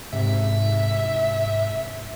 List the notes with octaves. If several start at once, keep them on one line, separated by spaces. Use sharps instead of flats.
G#2 C3 E5